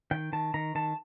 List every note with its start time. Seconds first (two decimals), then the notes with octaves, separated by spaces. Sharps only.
0.11 D#3 G5
0.33 D#3 A5
0.54 D#3 A#5
0.75 D#3 A5